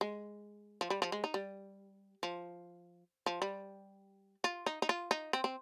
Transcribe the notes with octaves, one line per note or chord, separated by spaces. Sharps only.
G#3
F3
G3
F3
G#3
D#4
G3
F3
F3
G3
F4
D#4
D#4
F4
D#4
C4
C4